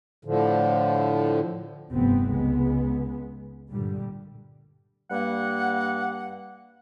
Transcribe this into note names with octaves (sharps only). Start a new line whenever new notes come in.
A2 D3 F3
F1 G2 B3 C4
C#2 G#3 B3
G2 A#2 D3 G3
G2 G3 A#3 F#5